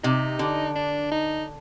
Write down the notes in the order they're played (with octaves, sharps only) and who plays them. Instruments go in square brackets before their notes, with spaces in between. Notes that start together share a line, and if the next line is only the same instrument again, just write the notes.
[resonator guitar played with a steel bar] C3 [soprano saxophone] D#4
[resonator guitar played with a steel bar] D3
[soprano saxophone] D4
D#4